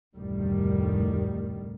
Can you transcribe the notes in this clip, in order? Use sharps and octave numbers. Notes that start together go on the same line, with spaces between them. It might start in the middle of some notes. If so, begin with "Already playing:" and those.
F1 D2 A2 D#3 G3